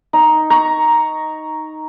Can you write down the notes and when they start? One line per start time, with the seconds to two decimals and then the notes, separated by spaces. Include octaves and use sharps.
0.13 D#4
0.50 A#5 C#6